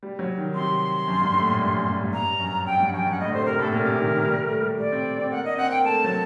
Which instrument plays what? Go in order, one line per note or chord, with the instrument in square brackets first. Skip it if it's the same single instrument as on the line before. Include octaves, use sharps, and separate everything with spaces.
[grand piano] G3
F#3
D#3
[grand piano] C3 [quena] C6
[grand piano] F#2
G2
A2
A#2
G2
F#2
G2
G2
[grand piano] G2 [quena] A#5
[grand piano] F#2
[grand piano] F#2 [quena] G5
[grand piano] G2
[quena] F#5
[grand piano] F#2 [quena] G5
[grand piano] F#2 [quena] F#5
[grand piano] A2 [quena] D#5
[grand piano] D3
[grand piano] C3 [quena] C5
[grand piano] C3 [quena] A#4
[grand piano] A2 [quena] A4
[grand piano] A#2 [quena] A#4
[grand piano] C3
D#3
D#3
G3
A3
G3
[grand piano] G3 [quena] D5
[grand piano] C4
C4
[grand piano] A#3 [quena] F#5
[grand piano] D4 [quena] D#5
[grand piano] C4 [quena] F#5
[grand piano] A#3 [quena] G5
[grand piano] A3 [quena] A5
[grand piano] F#3